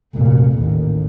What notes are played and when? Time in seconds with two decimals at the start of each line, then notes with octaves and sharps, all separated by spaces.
0.15 F1 A#2
0.59 A1 D#2